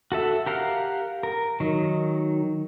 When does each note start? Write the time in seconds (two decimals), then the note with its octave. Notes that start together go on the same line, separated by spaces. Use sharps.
0.12 F#4 A4 E5
0.46 G4 A#4 F5 F#5
1.23 A#4
1.60 D#3 F#3